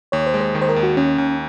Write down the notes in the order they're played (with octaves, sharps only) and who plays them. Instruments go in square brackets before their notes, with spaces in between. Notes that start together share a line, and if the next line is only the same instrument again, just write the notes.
[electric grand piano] D#2 [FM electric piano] C#5
[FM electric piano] C5
[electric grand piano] G#3
[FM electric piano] C5
[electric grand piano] D#3
[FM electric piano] C5
A#4
[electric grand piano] D#2
[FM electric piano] F#4
[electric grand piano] D#2 [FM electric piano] C#4
[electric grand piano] D#2